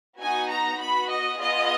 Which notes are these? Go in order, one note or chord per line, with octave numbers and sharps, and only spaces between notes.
B3 D#4 F#4 G#5
A#5
B3 F#4 B5
D#5
B3 F4 G#4 D#5